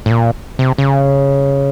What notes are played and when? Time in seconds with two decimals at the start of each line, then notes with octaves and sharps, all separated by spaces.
0.06 A2
0.11 A#2
0.59 C3
0.78 C#3